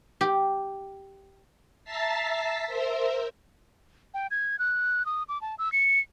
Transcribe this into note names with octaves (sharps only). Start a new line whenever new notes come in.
G4
E5 A5 A#5 A6 B6 C7
A#4 C5 E5
G5
G#6
F#6
D#6
D6
A5
E6
C#7